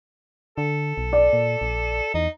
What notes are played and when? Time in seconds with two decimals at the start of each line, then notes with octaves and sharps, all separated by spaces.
0.58 D3 A4
0.98 B1
1.13 D5
1.33 A#2
1.61 A#1
2.14 E2 D#4